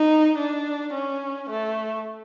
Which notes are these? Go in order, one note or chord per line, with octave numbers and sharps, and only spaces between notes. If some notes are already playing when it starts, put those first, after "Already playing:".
Already playing: D#4
D4
C#4
A3